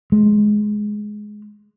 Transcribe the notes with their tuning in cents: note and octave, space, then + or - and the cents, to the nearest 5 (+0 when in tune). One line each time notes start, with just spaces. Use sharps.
G#3 +10